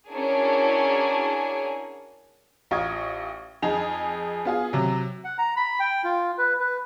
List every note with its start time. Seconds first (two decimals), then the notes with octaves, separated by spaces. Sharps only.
0.12 C#4 D4 E4 F#4 G#4 A#4
2.71 A1 F4 C#6 D#6 G#6
3.62 F2 D#4 G#4 F7
4.45 B3 F4 G#4
4.73 C3 F#3
5.25 F#5
5.38 A#5
5.56 B5
5.80 G5
6.04 F4
6.38 B4
6.60 B4